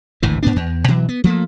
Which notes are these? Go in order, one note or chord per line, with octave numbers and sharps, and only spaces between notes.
G#1 D2 A2 E3
G#2 B3 D4
E2
B2 E3 F#3
B3
F3 G3 A3 A#3